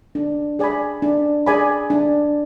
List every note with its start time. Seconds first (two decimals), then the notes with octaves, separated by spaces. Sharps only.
0.15 D4
0.59 G#4 D5 G#5 B5
1.02 D4
1.46 G#4 D5 G#5 B5
1.90 D4